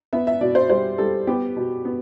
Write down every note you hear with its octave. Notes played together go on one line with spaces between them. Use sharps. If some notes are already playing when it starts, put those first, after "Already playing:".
B3 E5
E5
B2 D5
C5
G3 C5
G3 A4
B3 G4
B2
B3